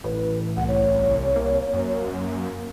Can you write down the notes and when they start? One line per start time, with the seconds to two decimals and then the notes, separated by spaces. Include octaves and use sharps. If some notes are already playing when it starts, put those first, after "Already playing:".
0.04 A1 A2 B4
0.57 C2 F#5
0.68 C#5
1.36 A#3
1.73 F#2